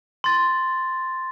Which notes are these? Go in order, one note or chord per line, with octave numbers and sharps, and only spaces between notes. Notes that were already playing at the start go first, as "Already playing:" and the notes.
C6 A6